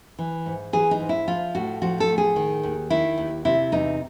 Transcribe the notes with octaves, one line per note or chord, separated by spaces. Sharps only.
E3
G#2
E3 G#4
D#4
G#2
E4
F3 F4
A2 F#4
F3 F#4
A4
A2
G#4
D#3
D#2
D#3 E4
D#2
C3 E4
E2 D#4